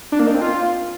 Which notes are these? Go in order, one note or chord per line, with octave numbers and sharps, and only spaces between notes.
D4
A#3
D#4
C4
F4